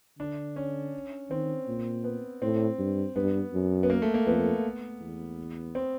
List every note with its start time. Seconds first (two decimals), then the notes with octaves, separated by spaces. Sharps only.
0.19 D3 D4
0.56 C#4
1.30 D#3 C4
1.67 A#2
2.04 B3
2.42 A2 C4
2.79 G2
3.16 G2 B3
3.53 F#2
3.83 B3
3.90 A#3
4.02 A3
4.14 A#3
4.27 F2 B3
5.00 E2
5.75 C4